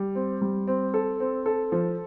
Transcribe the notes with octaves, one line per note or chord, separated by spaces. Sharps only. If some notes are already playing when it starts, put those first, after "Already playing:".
Already playing: G3
C4
G3
C4
A4
C4
A4
F3